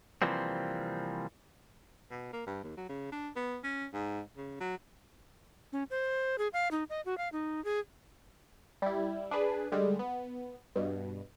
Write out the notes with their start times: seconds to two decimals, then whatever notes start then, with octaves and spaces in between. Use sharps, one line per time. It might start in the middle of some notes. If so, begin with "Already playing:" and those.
0.22 C3 E3 F3 G3 A#3 C4
2.11 B2
2.33 A#3
2.47 G2
2.64 D#2
2.77 F#3
2.89 C#3
3.12 D4
3.36 B3
3.64 C#4
3.93 G#2
4.37 C#3
4.60 F#3
5.73 C#4
5.90 C5
6.38 G#4
6.53 F5
6.71 D#4
6.90 D#5
7.06 F#4
7.18 F5
7.32 D#4
7.65 G#4
8.82 G3 E4
9.31 D4 G#4 B4
9.72 D3 G3 G#3
9.99 B3
10.76 G2 B2